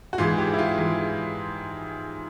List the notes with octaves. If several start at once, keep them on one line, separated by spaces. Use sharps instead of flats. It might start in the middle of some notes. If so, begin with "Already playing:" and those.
F#4
G#2 E3 G#3 F4
G4
E4
F4
G#2 E3 G#3